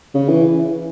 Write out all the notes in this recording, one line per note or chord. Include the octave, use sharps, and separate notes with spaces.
C#3
E3